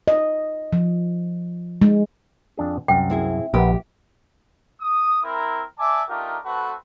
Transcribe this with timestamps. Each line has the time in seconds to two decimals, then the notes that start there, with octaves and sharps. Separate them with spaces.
0.08 D#5
0.73 F3
1.82 G#3
2.57 F2 D4 G#4
2.88 C2 F#2 G5
3.10 C4 E4 G#4
3.54 A#1 G4 A#4 B4 F#5
4.81 D#6
5.24 C4 E4 A#4
5.79 D5 E5 G#5 A5 D6
6.09 A3 D4 D#4 F4 G4 A#4
6.45 A3 C4 F#4 A4 B4